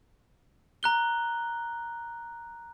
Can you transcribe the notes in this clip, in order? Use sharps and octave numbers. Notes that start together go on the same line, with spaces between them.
A#5 F#6 G7